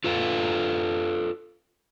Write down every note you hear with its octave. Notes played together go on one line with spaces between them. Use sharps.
F4 A4 B4 F5